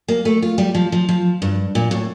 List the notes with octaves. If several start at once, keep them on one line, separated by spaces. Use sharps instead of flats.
A#3
A3
F4
G3
F3
F3
F3
G2
A#2
A2